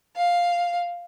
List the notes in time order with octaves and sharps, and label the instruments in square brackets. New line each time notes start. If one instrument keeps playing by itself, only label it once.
[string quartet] F5